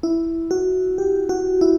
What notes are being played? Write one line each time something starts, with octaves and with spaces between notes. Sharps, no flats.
E4
F#4
G4
F#4
E4